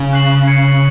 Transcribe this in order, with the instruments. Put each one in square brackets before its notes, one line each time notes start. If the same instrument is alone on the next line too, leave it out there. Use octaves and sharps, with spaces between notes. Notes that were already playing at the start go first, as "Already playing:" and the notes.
Already playing: [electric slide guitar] C#3
[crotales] C#6 F#6 C7 F#7
G#6 C#7 F#7